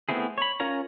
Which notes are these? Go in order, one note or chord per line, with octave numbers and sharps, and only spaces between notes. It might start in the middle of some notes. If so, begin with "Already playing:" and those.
A3 B3 C4 E4 G#4
C#5 B5
C#4 F4 A#4 C#5 A#5